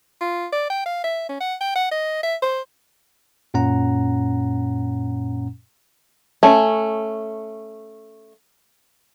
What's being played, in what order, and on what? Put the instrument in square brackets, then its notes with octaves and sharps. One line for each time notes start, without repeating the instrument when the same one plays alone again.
[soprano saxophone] F4
D5
G5
F5
E5
C#4
F#5
G5
F#5
D#5
E5
C5
[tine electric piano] F#2 A#2 C#4 F#5 A#5
[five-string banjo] A3 C#4